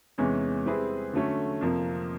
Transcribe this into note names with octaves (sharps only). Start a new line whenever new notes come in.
E2 C3 E3 G#3 C#4
G3 C4 E4 G#4 B4
D3 F#3 A3 C#4
F2 C3 F3 A#3